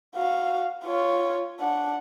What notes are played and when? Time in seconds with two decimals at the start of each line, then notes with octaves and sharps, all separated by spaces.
0.16 F#4 F5
0.85 F4 C#5
1.60 D4 F#5